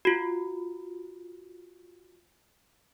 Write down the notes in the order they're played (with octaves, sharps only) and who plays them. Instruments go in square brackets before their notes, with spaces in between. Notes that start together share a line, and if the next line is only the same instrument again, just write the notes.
[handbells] F4 F#4